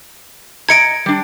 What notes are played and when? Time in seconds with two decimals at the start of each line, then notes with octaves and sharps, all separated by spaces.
0.69 D#5 A#5 G#6 C#7 D7
1.06 G3 D4